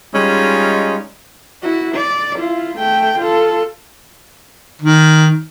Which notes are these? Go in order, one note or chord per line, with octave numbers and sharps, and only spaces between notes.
G3 G#3 C#4 D#4 F4
E4 F#4
D5
E4 F4
A3 G5
F4 A4
D#3